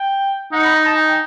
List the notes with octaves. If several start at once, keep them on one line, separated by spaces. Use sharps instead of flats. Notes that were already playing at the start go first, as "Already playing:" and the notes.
Already playing: G5
D#4 F#5
B5
A#5
D#4 A5
G#5
G5